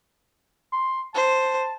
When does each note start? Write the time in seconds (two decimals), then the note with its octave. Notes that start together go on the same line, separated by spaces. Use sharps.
0.73 C6
1.15 C5 A5